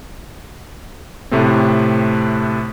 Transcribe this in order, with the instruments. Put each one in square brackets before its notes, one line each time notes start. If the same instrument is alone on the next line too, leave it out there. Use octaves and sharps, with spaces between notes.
[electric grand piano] A2 C3 A3 C4